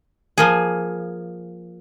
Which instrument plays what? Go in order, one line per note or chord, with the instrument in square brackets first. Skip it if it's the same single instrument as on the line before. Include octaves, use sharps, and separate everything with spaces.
[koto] F3 A#3 G#4